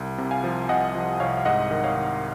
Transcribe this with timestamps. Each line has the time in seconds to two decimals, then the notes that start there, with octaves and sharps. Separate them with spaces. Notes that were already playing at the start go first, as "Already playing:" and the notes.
Already playing: C2
0.18 C3
0.31 F5 G#5
0.44 F3
0.69 C2 D#5 F#5
0.95 F3
1.20 C2 C#5 F5
1.37 F5
1.45 G#2 D#5 F#5
1.71 D#3
1.84 C#5 F5
1.96 D#3